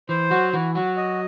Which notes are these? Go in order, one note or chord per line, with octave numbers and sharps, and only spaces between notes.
E3 C5
F#3 F#4
E3 F#4
F#3 F#4
D#5